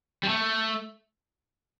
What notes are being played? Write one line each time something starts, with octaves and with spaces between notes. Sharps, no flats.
G3
A3